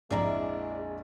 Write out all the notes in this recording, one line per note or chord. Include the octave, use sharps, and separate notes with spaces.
A#1 F2 G#3 D4 E4 G#4 D5 A#5